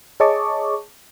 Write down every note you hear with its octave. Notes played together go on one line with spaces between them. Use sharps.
G#4 C#5 D#5 A5 C#6 D6